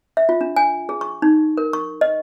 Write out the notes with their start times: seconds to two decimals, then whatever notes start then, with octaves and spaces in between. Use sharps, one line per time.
0.17 E5
0.29 F4
0.41 D4
0.56 G#5
0.89 G#4
1.01 C#6
1.22 D#4
1.58 A#4
1.73 C#6
2.01 D#5